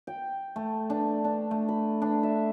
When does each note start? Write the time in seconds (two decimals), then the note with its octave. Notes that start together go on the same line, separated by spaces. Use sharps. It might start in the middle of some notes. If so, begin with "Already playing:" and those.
0.07 G5
0.56 A3
0.90 D4
1.24 D4
1.51 A3
1.69 B5
2.02 D4
2.23 E5